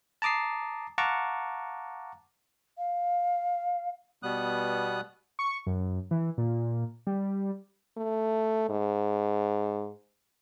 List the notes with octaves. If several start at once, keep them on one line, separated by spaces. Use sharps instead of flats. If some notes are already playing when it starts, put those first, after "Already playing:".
A5 A#5 D6 D#6 C7
F5 F#5 A5 A#5 C#6 D6
F5
B2 G3 B3 D#6 F#6
C#6
F#2
E3
A#2
G3
A3
G#2